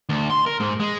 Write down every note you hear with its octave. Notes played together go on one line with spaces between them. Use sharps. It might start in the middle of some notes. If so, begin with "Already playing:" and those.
D2
C6
A#4
G#2
G#3